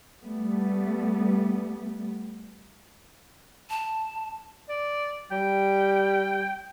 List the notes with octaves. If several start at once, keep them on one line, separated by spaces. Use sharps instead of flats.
G3 A3 B3
A5
D5
G3 G5